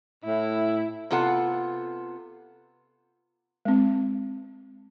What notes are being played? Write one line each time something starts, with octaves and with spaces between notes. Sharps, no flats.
A2 E4
C3 B3 F4 A4 F#5
G#3 C4